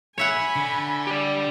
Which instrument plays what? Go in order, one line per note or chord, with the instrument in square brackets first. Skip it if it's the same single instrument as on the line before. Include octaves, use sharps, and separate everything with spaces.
[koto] C#5 E5 F#5 [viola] G#5 B5
[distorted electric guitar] D3
[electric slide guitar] G4 D5